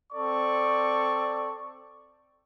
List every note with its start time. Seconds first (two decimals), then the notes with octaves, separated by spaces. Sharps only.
0.13 C4 A4 D5 C#6